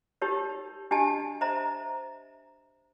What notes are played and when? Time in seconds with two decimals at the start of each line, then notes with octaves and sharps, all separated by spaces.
0.22 D#4 G4 A#4 C#5
0.91 D4 G4 D#5 G#5 A5
1.41 C5 D#5 E5 A#5